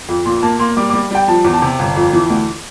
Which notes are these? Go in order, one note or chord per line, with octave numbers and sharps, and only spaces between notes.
F2
A#2 C6
A#3 A5
A#3 C6
G3 D6
G3 D6
G3 G5
F3 A5
E2
A5
C3
G1
F2
E3
D2